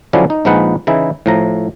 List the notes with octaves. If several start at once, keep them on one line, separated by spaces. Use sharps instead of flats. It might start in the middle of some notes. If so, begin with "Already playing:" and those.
D3 F3 F#3 C#4 D4 E4
D#4
A#1 F3 G#3 D#4 B4 F#5
C#3 E3 D#4 E4
A2 F3 A#5